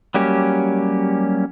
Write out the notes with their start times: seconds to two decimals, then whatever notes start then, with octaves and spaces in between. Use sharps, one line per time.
0.14 F#3 G3 A#3 C#4 G4